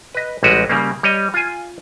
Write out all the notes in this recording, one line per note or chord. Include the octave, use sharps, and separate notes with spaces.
B4 D#5
A1 G3 G#3 F#4 G4 B4
C#3 G3 A#3
G3 C#5 D#5
F4 G#5